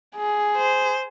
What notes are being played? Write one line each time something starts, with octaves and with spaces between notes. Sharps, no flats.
G#4
C5